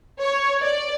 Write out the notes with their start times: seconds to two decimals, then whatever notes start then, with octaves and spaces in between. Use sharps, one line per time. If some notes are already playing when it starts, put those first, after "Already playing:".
0.20 C#5
0.61 D5